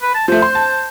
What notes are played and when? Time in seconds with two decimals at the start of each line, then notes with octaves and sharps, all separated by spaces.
0.02 B4
0.15 A5
0.28 F3 A3 C5
0.42 C6
0.55 A5